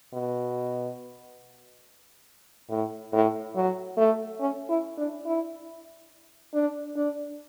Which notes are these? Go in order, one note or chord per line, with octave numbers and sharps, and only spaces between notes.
B2
A2
A2
F#3
A3
C#4
E4
D4
E4
D4
D4